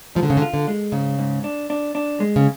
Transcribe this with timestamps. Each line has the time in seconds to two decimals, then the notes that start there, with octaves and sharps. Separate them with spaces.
0.15 G#2 F3
0.23 D3
0.30 C#3
0.37 D3
0.42 F4
0.54 D3
0.68 G#3
0.92 G#2 C#3
1.19 G#2
1.44 D4
1.70 D4
1.95 D4
2.20 G#3
2.36 C#3